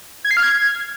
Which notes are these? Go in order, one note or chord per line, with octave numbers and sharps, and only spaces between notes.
G#6
C7
F6
G#6